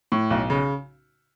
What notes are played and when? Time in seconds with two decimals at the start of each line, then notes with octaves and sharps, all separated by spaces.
0.12 A2
0.31 B1
0.50 C#3